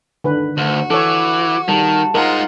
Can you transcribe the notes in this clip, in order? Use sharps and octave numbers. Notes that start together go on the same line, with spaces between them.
D3 D#3 B4
D2 F#4
E3 A4 C#5 D6
D#3 G3 A5
G#3 D#4 F4 A#4 F#5